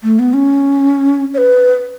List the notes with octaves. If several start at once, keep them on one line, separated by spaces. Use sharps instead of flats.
A3
B3
C#4
C#5
B4